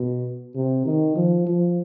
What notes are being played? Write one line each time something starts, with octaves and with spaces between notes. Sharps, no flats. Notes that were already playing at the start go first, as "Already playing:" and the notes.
Already playing: B2
C3
D#3
F3
F3